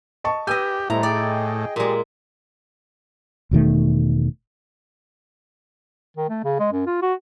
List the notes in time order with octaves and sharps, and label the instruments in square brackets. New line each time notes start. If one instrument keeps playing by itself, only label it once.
[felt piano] D#5 A5 C#6
[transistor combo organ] G4 [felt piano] B4 E6 G6 [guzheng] D#5 G#5
[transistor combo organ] A2 [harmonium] G3 G#3 C5 [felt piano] E4 A4 [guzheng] A#5
[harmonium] G#4 D#5 G5 [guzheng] D5
[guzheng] A#2 G#3 [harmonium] G4 G#4 D5
[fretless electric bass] E1 B2 D#3 A3
[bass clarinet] D#3
A3
C#3
G#3
F#2
F4
F#4